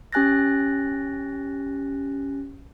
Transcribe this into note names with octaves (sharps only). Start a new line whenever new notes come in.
C#4 G4 G#5 F#6 A6 A#6